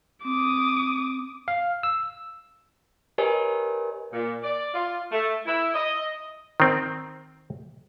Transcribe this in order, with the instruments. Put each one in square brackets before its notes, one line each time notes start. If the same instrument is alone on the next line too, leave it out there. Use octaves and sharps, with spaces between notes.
[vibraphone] C4 [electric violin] D6 D#6
[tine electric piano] F5
E6
[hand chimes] G4 A#4 B4 C#5 D#5 G#5
[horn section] A#2
D5
F4
A3
E4
D#5
[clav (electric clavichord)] D#3 C4